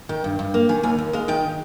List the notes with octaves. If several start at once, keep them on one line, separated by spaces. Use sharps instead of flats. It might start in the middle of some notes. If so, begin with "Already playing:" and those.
D#3 G5
G2
G2
A#3
D#3 G#5
D#2 G#5
D#2
G#3 F5
D#3 G5